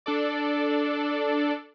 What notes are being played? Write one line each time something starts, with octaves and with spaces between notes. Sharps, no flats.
D4 A4 D5